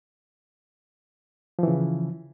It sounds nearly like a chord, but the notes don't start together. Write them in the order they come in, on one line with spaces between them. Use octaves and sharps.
F3 E3 C#3